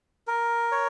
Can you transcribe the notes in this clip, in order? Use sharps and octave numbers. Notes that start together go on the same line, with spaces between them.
A#4
C#5